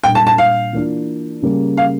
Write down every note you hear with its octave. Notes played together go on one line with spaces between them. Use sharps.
A#2 G3 D4 G5
A5
A5
F5
E3 A#3 D4 F4
C#3 G3 A#3 C#4
F5